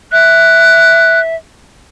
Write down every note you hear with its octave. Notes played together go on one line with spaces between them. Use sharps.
E5 F#6